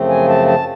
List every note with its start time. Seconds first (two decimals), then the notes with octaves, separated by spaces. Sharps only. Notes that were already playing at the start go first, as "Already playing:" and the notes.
Already playing: F#2 C#3 F3 A3 C4
0.09 G#5
0.28 A5
0.47 A5